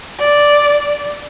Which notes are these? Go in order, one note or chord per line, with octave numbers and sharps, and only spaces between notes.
D5